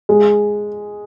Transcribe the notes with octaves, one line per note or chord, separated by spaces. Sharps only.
G#3